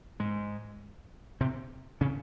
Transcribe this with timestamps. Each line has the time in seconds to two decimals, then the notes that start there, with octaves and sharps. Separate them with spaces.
0.20 G#2 G#3
1.41 C3 C4
2.01 C#3 C#4